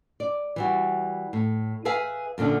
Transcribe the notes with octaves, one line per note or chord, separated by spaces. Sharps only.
D5
E3 G3 F#4
A2
G#4 B4 E5 F5 G#5
F#2 A#2 D3 D4